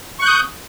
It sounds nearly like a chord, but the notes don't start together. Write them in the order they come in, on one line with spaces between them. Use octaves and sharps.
C#6 F#6 G6 D#6